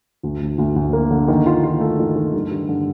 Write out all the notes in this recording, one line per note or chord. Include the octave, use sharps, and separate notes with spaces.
D2
D2
D2
D2
A#3
D3
D#3
F4
F4
A3
D#3
D#3
G2
G2
D3